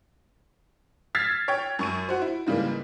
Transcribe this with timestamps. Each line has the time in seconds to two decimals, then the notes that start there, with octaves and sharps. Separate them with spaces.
1.15 E6 F6 G#6 A6 B6 C7
1.48 C#5 G5
1.79 F#2 C#6 D#7
2.09 F#4 C5
2.22 E4
2.47 G#2 C#3 E3 G3 A#3